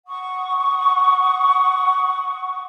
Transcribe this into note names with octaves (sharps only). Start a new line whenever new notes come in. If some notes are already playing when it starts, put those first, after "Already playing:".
F#5 C#6 D#6